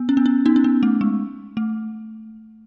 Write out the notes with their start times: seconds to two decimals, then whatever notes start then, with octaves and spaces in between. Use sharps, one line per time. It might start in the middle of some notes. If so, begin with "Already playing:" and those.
Already playing: B3
0.09 C#4
0.17 B3
0.26 C#4
0.46 B3 D#4
0.56 C#4
0.64 B3
0.83 A3
1.01 G#3
1.57 A3